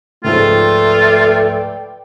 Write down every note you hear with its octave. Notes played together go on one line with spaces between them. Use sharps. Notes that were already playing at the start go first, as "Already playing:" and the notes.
C#2 G#2 F3 A3 F4 B4 D5 G5